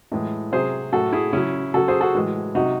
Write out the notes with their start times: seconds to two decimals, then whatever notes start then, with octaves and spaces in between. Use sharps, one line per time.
0.12 A2 E3 G#3
0.52 C3 F#3 G#4 C5
0.92 A2 F#3 F#4 A4
1.13 E4 G#4
1.33 C#3 F#3 C#4 E4
1.74 C#3 F#3 F#4 A4
1.88 G#4 C5
2.01 F#4 A4
2.15 A2 E3 G#3
2.55 C3 F#3 D#4 F#4